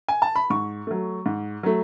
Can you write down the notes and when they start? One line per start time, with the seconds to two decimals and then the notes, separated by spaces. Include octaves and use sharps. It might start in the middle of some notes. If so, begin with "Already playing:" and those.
0.09 G#5
0.22 A5
0.36 B5
0.50 G#2 C#6
0.87 F#3 A3
1.26 G#2
1.63 F#3 A3